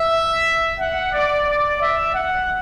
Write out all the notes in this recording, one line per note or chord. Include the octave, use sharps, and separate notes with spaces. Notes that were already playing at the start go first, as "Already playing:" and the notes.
Already playing: E5
F#5
D5
D5
E5
F#5